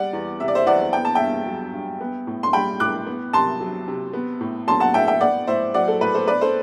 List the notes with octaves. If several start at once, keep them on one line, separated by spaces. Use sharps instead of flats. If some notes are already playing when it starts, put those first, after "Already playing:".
Already playing: G3 D5 F#5
E2
C3 E5
D5
C5 E5
E2 D5 F#5
B3 G5
A5
G2 E5 G5
F#3
G2
B3
A2
C6
G3 G5 B5
A2 D6 F#6
B3
C3 A5 C6
F#3
C3
B3
A2
F#3 A5 C6
F#5 A5
A2 E5 G5
E5 G5
B3 D5 F#5
A2 C5 E5
F#3 D5 F#5
A4
A2 B4
A4 C5
B3 B4 D5
A4 C5